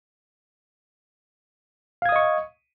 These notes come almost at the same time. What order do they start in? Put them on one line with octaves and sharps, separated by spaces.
F5 G#6 D#6 D#5 C#6